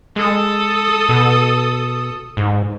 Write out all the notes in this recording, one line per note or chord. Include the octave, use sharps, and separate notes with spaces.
G#3 A4 D#6
B2
G#2